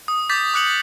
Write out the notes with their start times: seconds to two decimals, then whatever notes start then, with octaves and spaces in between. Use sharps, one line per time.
0.08 D#6
0.29 D6 G6 A6 B6
0.54 D6 F#6 C#7 F#7